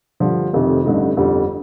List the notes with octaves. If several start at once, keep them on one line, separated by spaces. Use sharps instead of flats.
G2 D3 F3
F1 F2 C3 D#3
A1 G2 D3 A3 D#4
G1 F2 D3 G3